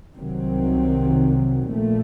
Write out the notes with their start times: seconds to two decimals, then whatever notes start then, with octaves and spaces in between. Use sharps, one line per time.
0.16 C2 C3 D#3 F#3 C4
1.70 A#1 A#2 A3